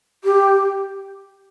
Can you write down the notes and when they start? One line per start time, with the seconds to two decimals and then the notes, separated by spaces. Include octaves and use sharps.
0.24 G4